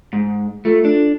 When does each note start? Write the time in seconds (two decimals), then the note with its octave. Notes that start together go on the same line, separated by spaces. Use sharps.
0.13 G#2
0.65 A3 F4 A4
0.85 D4